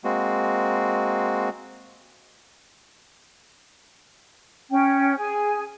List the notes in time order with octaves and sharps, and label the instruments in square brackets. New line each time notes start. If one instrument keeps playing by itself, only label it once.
[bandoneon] G#3 A#3 C4 F#4
[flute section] C#4 G5
G#4 G#5